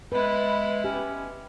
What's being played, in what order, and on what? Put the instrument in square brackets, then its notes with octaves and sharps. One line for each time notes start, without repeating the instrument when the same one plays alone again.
[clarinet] G#3 [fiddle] B3 E4 [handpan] B4
[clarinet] C#4 [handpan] G4